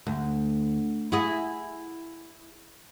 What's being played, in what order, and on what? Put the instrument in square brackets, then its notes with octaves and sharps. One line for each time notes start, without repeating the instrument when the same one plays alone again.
[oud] D2
E4 F#4 G#4